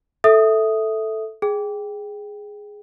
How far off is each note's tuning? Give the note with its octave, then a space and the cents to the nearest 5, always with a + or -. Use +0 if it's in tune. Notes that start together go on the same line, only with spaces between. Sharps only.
A4 +0 E5 -10 D#6 +0
G#4 +0 G5 +0